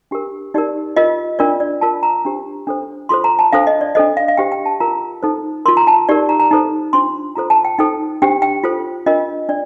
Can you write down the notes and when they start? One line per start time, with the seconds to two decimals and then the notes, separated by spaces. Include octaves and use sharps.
0.11 D4 G4 A#4
0.54 D#4 G4 A#4 D5
0.96 F4 A#4 D#5
1.39 D4 F4 A#4 D5
1.60 D5
1.81 F4 A#4 A5
2.03 A#5
2.25 D4 G4 C5
2.67 D4 A4 C5
3.09 F4 A4 C5 C6
3.24 A#5
3.39 A5
3.53 D4 A4 C5 F5
3.67 D#5
3.81 D5
3.95 D4 A4 C5 D#5
4.17 F5
4.28 F5
4.37 D4 G4 C5 G5
4.52 G5
4.66 A5
4.80 F4 A#4 A#5
5.23 D#4 A4 C5
5.66 A#4 C6
5.68 F4
5.77 A#5
5.87 A5
6.09 D#4 G4 A#4 D5
6.29 A#5
6.40 A#5
6.51 D#4 A4 C5
6.93 D4 F4 C5 C6
7.35 F4 A4 C5 A#5
7.50 A5
7.65 G5
7.79 D#4 A4 C5 G5
8.22 D4 G4 C5 G5
8.42 G5
8.64 F4 A4 C5
9.06 D4 F4 A#4 D#5
9.49 D4 D5